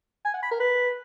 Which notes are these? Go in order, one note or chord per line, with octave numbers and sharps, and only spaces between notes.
G#5
F#5
B5
A#4
B4